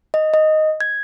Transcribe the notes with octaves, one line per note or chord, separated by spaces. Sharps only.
D#5
D#5
G#6